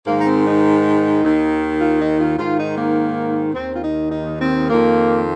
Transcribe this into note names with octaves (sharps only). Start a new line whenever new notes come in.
G#2 D#3 A#3
D#4
C4
D#4
D#2 D#3
F4
D#4
F4
G#2 D#3 F4
D#4
A#3
D#2 D#3 C4
F4
D#4
D#4
C4
F2 D#3 A#3